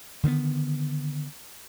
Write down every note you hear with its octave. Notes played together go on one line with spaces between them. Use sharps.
D3 D#3 G3 B3